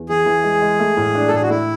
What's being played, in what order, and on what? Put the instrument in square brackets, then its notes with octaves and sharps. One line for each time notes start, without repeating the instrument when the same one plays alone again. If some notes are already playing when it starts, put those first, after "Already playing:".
Already playing: [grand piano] E2
[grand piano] E3 [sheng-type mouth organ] G#4
[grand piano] E3
G#3
G#3
A3
A2
D4
[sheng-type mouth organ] A4
[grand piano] A2 [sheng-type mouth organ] G#4
[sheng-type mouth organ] F#4
[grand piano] A3 [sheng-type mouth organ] E4